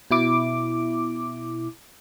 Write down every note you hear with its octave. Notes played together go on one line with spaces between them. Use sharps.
B2 E4 D6